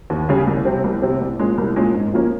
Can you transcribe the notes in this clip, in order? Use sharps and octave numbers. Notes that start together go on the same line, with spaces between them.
D#2
C#3 G3 C#4 G#4
C2
C3 G3 C4
C2
C3 G3 C4
C2
A#2 G#3 C#4
C2
A#2 G#3 C#4
G#2
F3 A#3 C#4